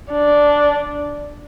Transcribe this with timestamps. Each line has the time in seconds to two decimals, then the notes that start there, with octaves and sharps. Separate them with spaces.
0.12 D4